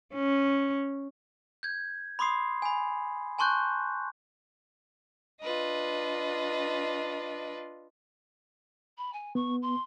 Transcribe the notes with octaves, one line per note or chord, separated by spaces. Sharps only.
C#4
G6 G#6
B5 C6 D6 D#6 C7
G#5 B5
G#5 A5 C6 C#6 F#6 G6
D4 F4 B4 D#5
B5
G#5
B3 C#6
C6